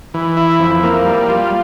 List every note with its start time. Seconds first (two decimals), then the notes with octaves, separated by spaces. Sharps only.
0.14 E3
0.37 E4
0.59 F2
0.83 A#3
1.05 G3
1.29 F4